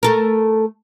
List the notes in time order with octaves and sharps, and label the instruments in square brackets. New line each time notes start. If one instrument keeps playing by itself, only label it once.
[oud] A3 A4 A#4